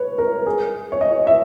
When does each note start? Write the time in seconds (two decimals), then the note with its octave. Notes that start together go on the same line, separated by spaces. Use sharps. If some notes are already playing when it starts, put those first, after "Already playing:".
Already playing: B4 C#5
0.18 A#4
0.46 G#4
0.92 C#5
1.01 D#5
1.27 E5